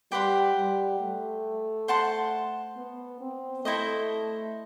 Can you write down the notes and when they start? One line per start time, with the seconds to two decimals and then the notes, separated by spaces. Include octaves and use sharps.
0.11 G3 G4 B4 F#5 C6
0.56 G3
1.00 A3
1.88 C5 F#5 A5 C6
2.77 B3
3.21 C4
3.65 A3 E4 A4 C5 D#5